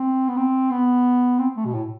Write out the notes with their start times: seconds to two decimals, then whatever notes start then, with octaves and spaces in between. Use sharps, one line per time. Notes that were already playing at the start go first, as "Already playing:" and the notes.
Already playing: C4
0.28 B3
0.37 C4
0.71 B3
1.39 C4
1.56 A3
1.65 B2
1.74 A2